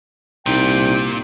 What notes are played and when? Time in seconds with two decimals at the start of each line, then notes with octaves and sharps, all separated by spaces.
0.46 C2 A#2 D#4 G5